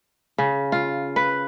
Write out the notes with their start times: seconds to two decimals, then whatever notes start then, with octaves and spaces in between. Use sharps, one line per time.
0.38 C#3
0.72 F4
1.16 B4